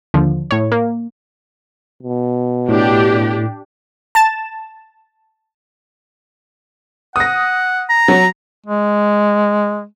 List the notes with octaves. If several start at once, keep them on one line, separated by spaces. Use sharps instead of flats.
D#2 D3 F3
A2 C#5
A#3
B2
A2 D4 G4
A5 A6 E7
F#5 D#6 A#6
A#5
F#3
G#3